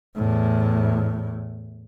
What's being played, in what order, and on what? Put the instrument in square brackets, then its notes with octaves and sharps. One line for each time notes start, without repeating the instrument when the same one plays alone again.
[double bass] E2 A2